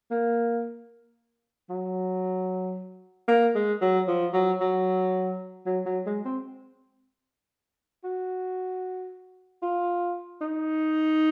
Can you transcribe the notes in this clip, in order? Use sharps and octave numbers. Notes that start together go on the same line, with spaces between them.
A#3
F#3
A#3
G#3
F#3
F3
F#3
F#3
F#3
F#3
G#3
C4
F#4
F4
D#4